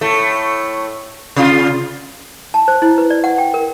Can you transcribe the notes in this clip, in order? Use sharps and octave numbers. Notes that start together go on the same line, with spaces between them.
A2 A3
C3 F4
A5
C5
E4
B4
D5
F#5
G5
A#4